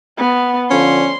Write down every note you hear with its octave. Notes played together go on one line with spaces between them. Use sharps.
B3
D3 F3 C#4 C6